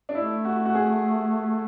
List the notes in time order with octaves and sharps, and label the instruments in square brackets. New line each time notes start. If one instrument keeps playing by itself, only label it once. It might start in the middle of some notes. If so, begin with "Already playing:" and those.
[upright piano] D4
[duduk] A3 [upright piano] E4
[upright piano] F#4
F#4
G#4